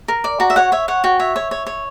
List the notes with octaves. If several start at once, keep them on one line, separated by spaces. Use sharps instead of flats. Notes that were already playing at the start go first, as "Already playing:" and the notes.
A#4
D5
F#4 A#5
E5
C#5 F#5
C#5 E5
C#5 F#5
F#4 G5
C#5 E5
C#5
C#5
C#5